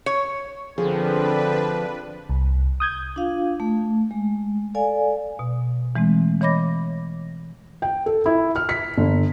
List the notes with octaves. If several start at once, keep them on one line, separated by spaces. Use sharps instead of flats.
C#5
D3 F3 C4 D4 G#4 B4
C2
D#6 G6 G#6
D4 F4 F5
A3
G#3
A4 D5 F5 G#5
B2
E3 G#3 A3 C4
E3 C#5 D#5 B5 D6 A#6
G5
A4
E4
F6
B6
G1